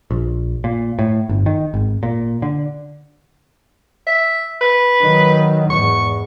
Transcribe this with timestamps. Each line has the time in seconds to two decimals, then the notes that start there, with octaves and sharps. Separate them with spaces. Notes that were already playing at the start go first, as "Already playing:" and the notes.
0.11 A#1
0.64 A#2
0.99 A2
1.29 G1
1.46 D#3
1.74 G#1
2.03 A#2
2.42 D3
4.07 E5
4.61 B4
5.01 D#3 F#3
5.70 E2 G#2 C#6